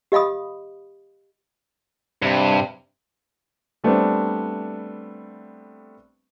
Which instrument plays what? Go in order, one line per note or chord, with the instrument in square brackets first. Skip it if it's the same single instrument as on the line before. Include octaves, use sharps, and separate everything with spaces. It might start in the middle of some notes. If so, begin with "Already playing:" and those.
[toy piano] G4 D#5 F5 B5 D#6
[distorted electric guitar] G2 [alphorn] C3
[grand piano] G3 A3 B3 C4 D4